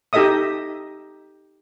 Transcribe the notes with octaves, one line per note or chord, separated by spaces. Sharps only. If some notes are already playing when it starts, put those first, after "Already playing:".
D#4 G4 A4 D#5 E5 D#6